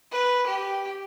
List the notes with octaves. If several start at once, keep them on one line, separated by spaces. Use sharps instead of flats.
B4
G4